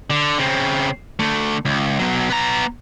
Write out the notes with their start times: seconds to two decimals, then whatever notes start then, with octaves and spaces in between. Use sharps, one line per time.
0.10 D3
0.38 C#3 C4
1.19 D3 A3
1.65 C#2
1.99 B2 F#3
2.30 B3 A#5